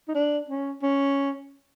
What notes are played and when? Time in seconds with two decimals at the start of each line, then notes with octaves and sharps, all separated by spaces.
0.08 D#4
0.14 D4
0.49 C#4
0.83 C#4